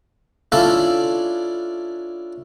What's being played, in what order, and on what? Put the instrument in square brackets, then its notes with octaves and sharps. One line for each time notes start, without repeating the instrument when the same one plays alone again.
[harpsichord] C#4 D4 E4 F4 A4 D5